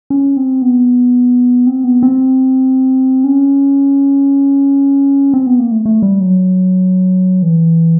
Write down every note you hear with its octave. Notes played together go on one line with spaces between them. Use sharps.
C#4
C4
B3
C4
B3
C4
C#4
C4
B3
A#3
A3
A3
G3
F#3
E3